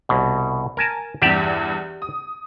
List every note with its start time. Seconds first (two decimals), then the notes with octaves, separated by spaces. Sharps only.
0.09 C2 B2
0.77 A#4 G#5 A5
1.22 E2 G2 G4 D5 E5
2.02 D#6